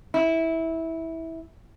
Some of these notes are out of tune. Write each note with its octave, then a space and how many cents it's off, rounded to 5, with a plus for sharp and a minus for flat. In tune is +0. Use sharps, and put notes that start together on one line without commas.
E4 -15